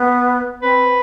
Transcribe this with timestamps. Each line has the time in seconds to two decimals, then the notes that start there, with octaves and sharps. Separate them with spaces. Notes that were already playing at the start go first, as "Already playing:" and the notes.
Already playing: B3
0.62 C4 B4